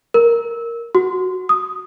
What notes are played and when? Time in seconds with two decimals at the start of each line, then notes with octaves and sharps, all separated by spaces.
0.14 A#4
0.95 F#4
1.49 D#6